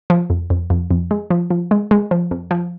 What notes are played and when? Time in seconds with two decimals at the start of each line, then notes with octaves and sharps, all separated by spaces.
0.10 F3
0.30 F2
0.50 F2
0.70 F2
0.91 F2
1.11 G#3
1.31 F3
1.51 F3
1.71 G#3
1.91 G#3
2.11 F3
2.31 F2
2.51 F3